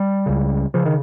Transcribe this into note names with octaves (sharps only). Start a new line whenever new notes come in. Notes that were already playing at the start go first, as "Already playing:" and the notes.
Already playing: G3
C#2 C#3
C#3 F3
D#3